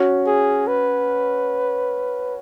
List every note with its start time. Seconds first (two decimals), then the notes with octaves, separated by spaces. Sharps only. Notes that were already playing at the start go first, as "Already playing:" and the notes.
Already playing: C#4 F#4
0.27 G#4
0.67 B4